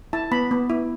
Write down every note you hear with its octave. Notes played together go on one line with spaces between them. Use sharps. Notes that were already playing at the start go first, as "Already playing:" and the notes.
E4 A5
B3 B5
B3
E4